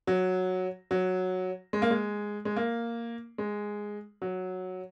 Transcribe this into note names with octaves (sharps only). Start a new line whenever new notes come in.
F#3
F#3
G#3
A#3
G#3
G#3
A#3
G#3
F#3